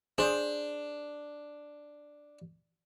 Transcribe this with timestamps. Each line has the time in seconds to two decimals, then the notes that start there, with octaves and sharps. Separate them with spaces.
0.18 D4 G#4 C5